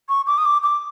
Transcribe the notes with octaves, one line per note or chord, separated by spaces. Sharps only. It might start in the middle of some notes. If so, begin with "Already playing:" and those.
C#6
D6
D#6
D6
D6